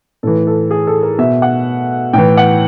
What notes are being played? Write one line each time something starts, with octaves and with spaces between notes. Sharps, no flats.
A2 E3 A4
A4
G#4
A4
A#4
B2 E5
F#5
A2 E3 G5
F#5